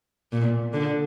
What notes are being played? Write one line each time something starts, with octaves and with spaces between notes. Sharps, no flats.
A#2
D3